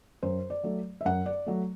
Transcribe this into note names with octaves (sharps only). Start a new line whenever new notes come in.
F#2 C5
D5
F#3 A3
E5
F#2 F#5
D5
F#3 A3